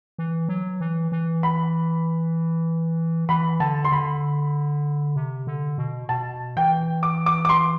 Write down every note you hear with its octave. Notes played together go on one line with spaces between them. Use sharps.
E3
F#3
E3
E3
B5
E3 B5
D3 A5
C6
D3 B5
C3
D3
B2
B2 A5
E3 G5
D6
D6
D6
C6